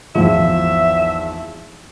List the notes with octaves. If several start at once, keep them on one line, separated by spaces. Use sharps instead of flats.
G#1 E2 F3 E5